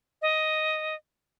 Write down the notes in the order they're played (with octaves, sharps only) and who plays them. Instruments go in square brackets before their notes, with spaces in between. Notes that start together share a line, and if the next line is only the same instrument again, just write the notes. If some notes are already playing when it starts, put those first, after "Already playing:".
[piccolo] D#5